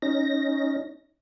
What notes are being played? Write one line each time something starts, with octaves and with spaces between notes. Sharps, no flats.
C#4 D#4 A#6